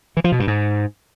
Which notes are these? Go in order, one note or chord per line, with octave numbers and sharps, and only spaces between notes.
E3
F3
B2
G2
G#2